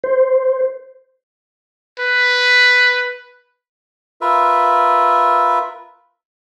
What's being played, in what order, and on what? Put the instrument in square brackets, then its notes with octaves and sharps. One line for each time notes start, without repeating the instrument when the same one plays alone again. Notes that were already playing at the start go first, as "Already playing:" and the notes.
[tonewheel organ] C5
[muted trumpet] B4
[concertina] F4 A#4 B4 E5